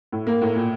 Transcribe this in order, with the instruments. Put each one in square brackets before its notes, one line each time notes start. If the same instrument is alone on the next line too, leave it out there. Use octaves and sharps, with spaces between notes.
[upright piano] A2
A#3
A2
A#2